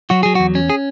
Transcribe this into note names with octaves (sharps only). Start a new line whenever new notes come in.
F#3 F#4
F#3 G#4
E2 F#4
C#4
G#4